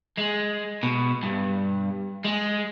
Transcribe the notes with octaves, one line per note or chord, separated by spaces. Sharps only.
G#3
B2
G2
G#3